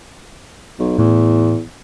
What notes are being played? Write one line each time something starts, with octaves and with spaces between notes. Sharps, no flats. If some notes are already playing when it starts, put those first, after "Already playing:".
B1
E2 A2